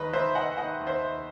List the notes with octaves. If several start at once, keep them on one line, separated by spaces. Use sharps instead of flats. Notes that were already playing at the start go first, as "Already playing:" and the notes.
Already playing: D#2 D#3 B4 D#5
D#2 C5 E5
D#3 D#5 F#5
D#3 D#5 F#5
D#2
C5 E5
D#2